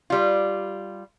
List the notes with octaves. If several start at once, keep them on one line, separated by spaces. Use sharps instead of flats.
G3 F4